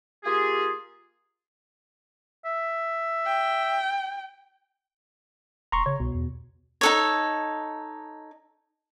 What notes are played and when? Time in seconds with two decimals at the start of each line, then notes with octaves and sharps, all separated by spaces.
0.24 A#3 F4 G4 G#4
2.45 E5
3.26 G5
5.72 E1 A#5 C6 C#6
5.86 C#3 C#5
6.00 C2 B2
6.14 E2
6.81 D#4 A4 C#5